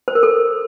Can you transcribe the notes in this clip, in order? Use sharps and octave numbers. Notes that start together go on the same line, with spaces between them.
C5
A#4
A4